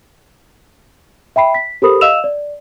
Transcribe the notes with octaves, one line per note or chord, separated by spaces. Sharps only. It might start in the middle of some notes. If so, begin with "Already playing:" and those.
E5 G5 B5 C7
B6
G4 A4 A#4 C5 B5 D#6
D#5 F5 E6 E7 F7
D5